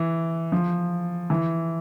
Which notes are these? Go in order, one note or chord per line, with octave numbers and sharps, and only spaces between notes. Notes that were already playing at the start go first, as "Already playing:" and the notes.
Already playing: E3
F3
E3